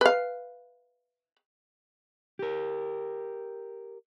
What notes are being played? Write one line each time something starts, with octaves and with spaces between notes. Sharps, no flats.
B4 F5
G4 A#4